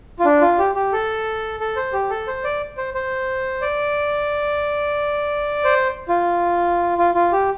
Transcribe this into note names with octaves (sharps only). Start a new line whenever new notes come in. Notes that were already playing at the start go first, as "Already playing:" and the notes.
F4
D4
F4
G4
G4
A4
A4
C5
G4
A4
C5
D5
C5
C5
D5
C5
F4
F4
F4
G4